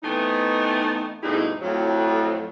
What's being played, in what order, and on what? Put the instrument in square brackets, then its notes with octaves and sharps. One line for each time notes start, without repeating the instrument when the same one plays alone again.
[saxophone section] E3 A3 B3 C4 D#4
D2 G2 B2 D#4 E4 G#4
F2 A2 F#3